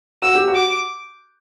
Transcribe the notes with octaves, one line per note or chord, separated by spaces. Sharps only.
F#4 E6
G4
F#4
D6